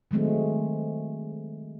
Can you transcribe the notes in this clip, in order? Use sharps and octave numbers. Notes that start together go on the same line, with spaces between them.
D#3 F#3 G#3 A3 C4